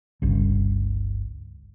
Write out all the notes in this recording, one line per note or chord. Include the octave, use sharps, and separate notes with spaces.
G1 C#2